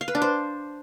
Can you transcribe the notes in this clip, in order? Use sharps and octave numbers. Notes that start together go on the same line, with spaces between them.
F5
B4
D4
C5